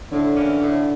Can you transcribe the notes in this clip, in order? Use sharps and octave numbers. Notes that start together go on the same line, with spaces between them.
A2 D3
E3 A#3 C#4
A2